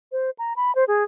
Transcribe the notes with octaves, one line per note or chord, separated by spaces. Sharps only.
C5
A#5
B5
C5
G#4